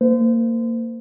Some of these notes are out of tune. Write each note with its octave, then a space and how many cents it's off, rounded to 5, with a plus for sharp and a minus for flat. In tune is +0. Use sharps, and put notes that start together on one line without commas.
A#3 -20 C5 -35